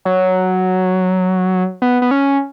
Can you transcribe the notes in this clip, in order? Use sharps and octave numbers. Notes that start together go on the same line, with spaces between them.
F#3
B3
B3
C#4